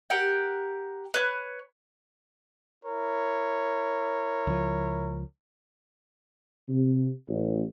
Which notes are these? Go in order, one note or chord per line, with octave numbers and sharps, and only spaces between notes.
G4 A#4 F#5 G5
B4 C#5 F#6
E4 A#4 C#5
C#2 F3
C3
A1